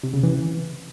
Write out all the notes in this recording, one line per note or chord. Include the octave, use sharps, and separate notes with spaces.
C3
C#3
E3